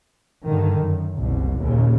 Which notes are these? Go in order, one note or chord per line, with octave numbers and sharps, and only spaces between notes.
G2 D3 D#3
F#2
F#1 C2 B2
D#2 A#2 C#3